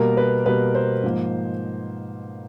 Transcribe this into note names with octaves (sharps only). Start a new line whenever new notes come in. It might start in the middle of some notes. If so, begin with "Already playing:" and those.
Already playing: B2 G3 A#3 A#4
B4
B2 G3 A#3 B4
C5
G#2 F3 A#3